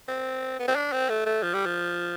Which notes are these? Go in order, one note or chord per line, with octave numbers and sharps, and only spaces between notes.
C4
B3
C4
D4
C4
A3
A3
F3
G3
F3